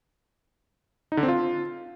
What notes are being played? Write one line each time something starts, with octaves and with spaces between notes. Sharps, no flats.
D#4
D3
C4
F4